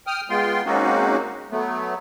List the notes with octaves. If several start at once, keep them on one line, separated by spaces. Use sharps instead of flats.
G5 D#6 F6
G#3 B3 F4 G5 C6
G#3 A#3 C4 C#4 D#4 F#4
F#3 A3 B3